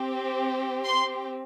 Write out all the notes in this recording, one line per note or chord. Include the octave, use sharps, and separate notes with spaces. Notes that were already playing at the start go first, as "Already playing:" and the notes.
Already playing: C4 G4
C6